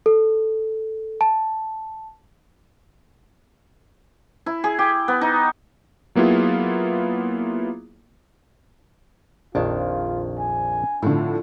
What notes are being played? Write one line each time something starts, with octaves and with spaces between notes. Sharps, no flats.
A4
A5
E4
G#4
G4
B3
D#4
F#3 A#3 B3 E4 F4 G#4
A#1 F2 D#3 D4 F4
G#5
A2 D3 F3 C4